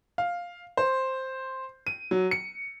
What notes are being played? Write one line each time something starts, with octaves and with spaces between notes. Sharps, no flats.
F5
C5
D#7
F#3
C#7